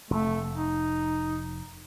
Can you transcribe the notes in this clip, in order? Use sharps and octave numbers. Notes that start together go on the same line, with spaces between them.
F1 A3
D#4